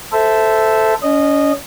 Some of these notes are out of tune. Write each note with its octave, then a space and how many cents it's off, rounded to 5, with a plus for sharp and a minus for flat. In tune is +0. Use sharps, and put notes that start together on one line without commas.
A4 +0 C5 -15 E5 +0
C#4 +35 D#5 -15